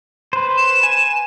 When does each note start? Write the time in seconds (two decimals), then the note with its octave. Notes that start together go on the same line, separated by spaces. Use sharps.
0.33 B4 C5
0.57 E7
0.83 G#5